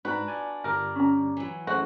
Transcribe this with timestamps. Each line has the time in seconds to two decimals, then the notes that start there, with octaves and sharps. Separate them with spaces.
0.05 G#2 D4 F#4 B4 A#5
0.28 D5 G#5
0.64 G1 G3 A#4 D6
0.95 C#4 A#5
1.37 E3 F#3
1.67 F#2 G#3 A3 F#4 C5